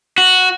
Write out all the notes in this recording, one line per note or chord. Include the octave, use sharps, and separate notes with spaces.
F#4